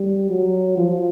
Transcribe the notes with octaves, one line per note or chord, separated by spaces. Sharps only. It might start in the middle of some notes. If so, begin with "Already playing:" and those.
Already playing: G3
F#3
F3